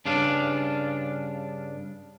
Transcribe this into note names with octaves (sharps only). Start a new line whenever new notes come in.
G2 C#3 D4 F4